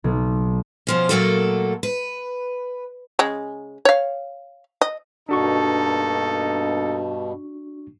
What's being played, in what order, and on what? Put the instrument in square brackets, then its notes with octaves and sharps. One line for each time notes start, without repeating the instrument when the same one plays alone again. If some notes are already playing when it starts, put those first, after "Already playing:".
[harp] B1
[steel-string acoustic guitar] B2 F3 C#4
A#2 F#3 A3 A#3 F#4 A4
B4
[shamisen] C#3 G#3
C#5 F5
D#5
[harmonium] G2 B2 [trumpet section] A#3 D#4 A4 [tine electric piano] D4 F#4 C#6